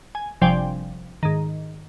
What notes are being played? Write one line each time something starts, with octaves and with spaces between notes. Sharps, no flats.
G#5
G1 C3 F3 D5 G5 G#5
G#2 D#3